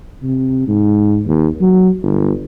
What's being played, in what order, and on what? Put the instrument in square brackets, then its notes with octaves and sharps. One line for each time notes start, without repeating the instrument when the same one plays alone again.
[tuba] C3
G#2
D#2
F#3
G1